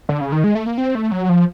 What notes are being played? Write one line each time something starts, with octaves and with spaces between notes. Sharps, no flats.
D3
C#3
D#3
G#3
A3
A#3
C4
A3
F#3
F3